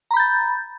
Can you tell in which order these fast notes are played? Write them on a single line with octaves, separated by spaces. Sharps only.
A#5 B5 G6 A6